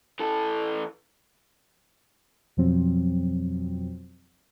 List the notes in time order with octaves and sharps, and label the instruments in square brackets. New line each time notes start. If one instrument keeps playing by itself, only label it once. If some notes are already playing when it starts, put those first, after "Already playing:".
[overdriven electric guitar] E3 A4
[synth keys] F2 B2 F3 F#3 C4